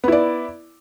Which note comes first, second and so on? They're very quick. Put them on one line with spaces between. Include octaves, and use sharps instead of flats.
B3 E4 D5